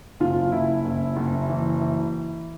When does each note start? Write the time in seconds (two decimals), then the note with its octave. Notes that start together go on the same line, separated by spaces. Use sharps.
0.20 F#1 F4
0.52 F#1 E4
0.84 F#1
1.16 F#1
1.49 E3
1.81 E3